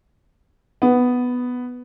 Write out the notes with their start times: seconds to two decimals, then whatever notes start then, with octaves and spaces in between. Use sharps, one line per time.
0.82 B3